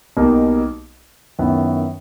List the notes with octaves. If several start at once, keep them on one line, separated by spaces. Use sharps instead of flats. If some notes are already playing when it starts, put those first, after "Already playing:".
B1 B2 G3 A#3 D#4
F#2 D#3 F#3 B3 E4